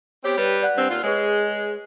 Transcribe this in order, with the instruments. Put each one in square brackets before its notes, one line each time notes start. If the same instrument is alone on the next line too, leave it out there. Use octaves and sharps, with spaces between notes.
[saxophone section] B3 C4 G4 [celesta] C#5
[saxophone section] G3 B4
[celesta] D5 F#5 F#6
[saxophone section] G2 C4
D#2 F4
[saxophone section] G#3 [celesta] G#4 B4 C#5